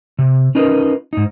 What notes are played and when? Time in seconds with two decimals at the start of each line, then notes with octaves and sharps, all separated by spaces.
0.19 C3
0.55 C#4 D#4 F4 A#4 B4 D#5
1.13 G#2 D#4